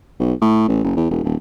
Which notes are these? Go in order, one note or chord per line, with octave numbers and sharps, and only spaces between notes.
B1
A2
A1
F#1
E2
E1
D#1